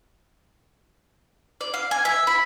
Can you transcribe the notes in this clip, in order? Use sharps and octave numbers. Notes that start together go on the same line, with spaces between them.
D5
F5
G#5
E5
B5